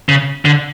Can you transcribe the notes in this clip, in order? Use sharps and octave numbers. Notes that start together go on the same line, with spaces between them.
C#3
D3